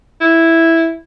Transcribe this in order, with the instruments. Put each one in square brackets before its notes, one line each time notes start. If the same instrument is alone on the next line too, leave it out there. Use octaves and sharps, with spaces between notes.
[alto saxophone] E4